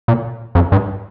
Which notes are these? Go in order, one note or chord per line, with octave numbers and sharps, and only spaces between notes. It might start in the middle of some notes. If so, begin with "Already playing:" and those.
A#2
F2
G2